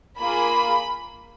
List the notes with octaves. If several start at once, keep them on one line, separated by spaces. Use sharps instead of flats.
A#3 F4 G#4 B5